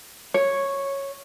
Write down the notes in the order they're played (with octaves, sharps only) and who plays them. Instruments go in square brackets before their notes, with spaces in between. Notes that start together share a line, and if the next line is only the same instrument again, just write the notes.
[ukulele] C#5